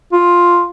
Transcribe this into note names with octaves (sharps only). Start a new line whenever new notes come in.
F4